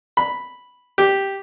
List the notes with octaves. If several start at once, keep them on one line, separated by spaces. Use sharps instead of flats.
B5
G4